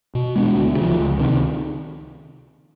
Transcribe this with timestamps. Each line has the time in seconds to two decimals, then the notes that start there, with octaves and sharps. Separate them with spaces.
0.15 B2
0.36 G#3 B3 D4
0.56 D2
0.77 C#3 F3
0.99 C#2
1.19 C3 D#3